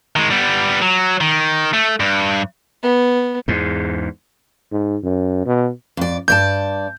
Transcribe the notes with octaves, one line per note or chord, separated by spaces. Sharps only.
D#3 G#3
G3 B3
F#3
D#3
A3
G2
B3
E2 G#2
G#2
F#2
B2
F2 D5
G2 D5 A5 G6